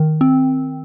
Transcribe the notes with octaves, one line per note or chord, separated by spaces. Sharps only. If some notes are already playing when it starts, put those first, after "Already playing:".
Already playing: D#3
C4